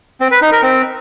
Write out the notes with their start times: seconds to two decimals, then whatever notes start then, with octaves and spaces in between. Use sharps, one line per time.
0.21 C4
0.31 B4
0.42 D#4
0.52 A#4
0.63 C4